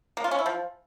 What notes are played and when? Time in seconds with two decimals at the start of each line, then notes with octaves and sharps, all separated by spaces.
0.17 A#3
0.24 F4
0.31 C#4
0.39 E4
0.46 F3